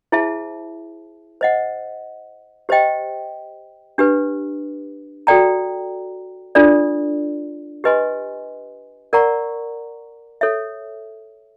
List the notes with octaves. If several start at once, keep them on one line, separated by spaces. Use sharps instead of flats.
E4 G#4 C5 E5 A5
C5 D#5 F#5
G4 C5 D#5 G5
D4 G4 B4
F#4 A4 D5 G5 A#5
D4 F4 A4 D5
G4 B4 D#5 G#5 C6
A#4 D5 F#5 A#5 C#6
A4 C#5 E5